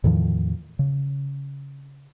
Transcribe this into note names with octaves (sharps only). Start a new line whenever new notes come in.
E2 A2 D#3 F3
C#3